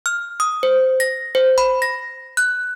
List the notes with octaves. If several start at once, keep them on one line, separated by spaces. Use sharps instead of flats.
F6
D#6
C5
A#6
C5
B5
A#6
F#6